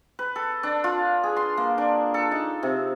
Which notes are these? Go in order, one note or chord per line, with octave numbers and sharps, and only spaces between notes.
B4
A4
D4
F4
G#4
C6
A#3
D4
A4
D#4
C3